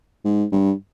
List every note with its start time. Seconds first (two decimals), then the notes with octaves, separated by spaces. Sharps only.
0.25 G#2
0.52 G2